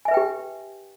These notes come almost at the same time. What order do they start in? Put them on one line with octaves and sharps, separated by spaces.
G#5 E5 B4 G5 G4